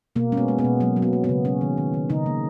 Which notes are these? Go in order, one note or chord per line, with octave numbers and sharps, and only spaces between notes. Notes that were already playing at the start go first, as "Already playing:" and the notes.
B2 A#3
G#3 C#4
B3
G#3
B3
B2
F#3 A#3
F#3
B3
A#3
B3
C#3
G#3 C#4
D#3
D#3
D#3
C#3 D#4
A#3